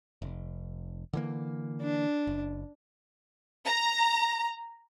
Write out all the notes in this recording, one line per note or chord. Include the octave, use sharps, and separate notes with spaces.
F1
D3 E3 A#3
D4
F#1
A#5